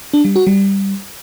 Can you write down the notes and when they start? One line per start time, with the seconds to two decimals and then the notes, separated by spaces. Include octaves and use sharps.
0.13 D4
0.25 G3
0.36 F#4
0.47 G3